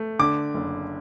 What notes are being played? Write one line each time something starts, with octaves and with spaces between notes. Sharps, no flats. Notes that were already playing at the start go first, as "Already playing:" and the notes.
Already playing: A3
D3 D6
F#1